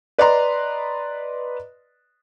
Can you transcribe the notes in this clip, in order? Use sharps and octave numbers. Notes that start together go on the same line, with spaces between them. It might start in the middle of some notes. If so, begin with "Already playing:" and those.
B4 D5 D#5 A#5 C6